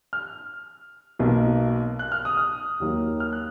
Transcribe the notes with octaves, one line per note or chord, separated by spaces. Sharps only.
F6
B1 B2 A#3
F#6
F6
D#6
F6
D#2 D#3 F#3 A#3
F6
F#6